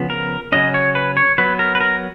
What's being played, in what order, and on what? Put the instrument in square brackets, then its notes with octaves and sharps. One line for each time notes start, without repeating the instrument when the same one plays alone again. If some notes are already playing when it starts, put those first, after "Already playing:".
Already playing: [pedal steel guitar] C#3 F3 B3
A#4
C#3 F#3 C#4 D#5
C#5
B4
C#5
F#3 B3 B4
A#4
B4
A#4